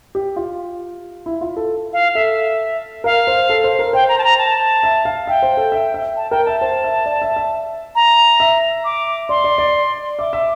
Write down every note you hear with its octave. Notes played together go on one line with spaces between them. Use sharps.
G4
F4
E4
F4
A4
F5
A4 E5
A#4 F5
C5
A4
C5
A#4
C5 G5
A#5
A5
A#5
A5
E5
F5
E5 G5
C5
A4
E5
E5
A5
A#4 G5
E5 A5
C5 A5
E5
D5
E5
E5
A#5
E5
D6
D5 C6
D5
D5
E5 D6
E5